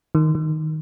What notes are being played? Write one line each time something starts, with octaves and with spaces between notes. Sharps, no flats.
D#3
D#3